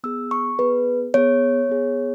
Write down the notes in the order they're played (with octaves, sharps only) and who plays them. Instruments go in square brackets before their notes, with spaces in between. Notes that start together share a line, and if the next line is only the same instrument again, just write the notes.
[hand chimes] B3 G#4 E6
C#6
B3 G#4 B4
B3 G#4 C#5
B3 G#4